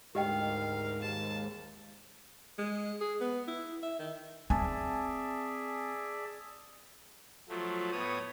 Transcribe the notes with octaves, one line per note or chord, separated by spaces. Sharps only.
D2 G#2 G4 A#4 D#5 F5 G5
D#2 A5
G#3
G#4
B3
E4
E5
D#3
C4 G#4 D5 E5 G#5 A5
F3 F#3 A3
A2 B3 C#5 D#6